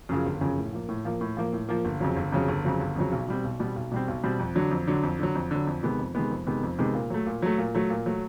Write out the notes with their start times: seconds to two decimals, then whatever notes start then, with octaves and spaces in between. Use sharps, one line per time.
0.09 F#2 C#3 F3
0.26 G1
0.41 F#2 C#3 F3
0.58 A2
0.73 F3 A#3
0.89 A2
1.05 F3 A#3
1.21 A2
1.37 F3 A#3
1.53 A2
1.69 F3 A#3
1.85 G1
2.00 F2 C#3 F#3
2.17 G1
2.32 F2 C#3 F#3
2.48 G1
2.65 F2 C#3 F#3
2.80 G1
2.96 F2 C#3 F#3
3.12 B1
3.28 B2 G3 C4
3.44 B1
3.60 B2 G3 C4
3.76 B1
3.92 B2 G3 C4
4.08 B1
4.23 B2 G3 C4
4.39 F2
4.55 D3 F#3
4.71 F2
4.87 D3 F#3
5.03 F2
5.19 D3 F#3
5.35 F2
5.51 D3 F#3
5.67 F2
5.83 C3 D#3 G#3 B3
5.99 F2
6.15 C3 D#3 G#3 B3
6.31 F2
6.46 C3 D#3 G#3 B3
6.63 F2
6.79 C3 D#3 G#3 B3
6.94 A#2
7.10 F#3 A3
7.26 A#2
7.42 F#3 A3
7.58 A#2
7.75 F#3 A3
7.90 A#2
8.06 F#3 A3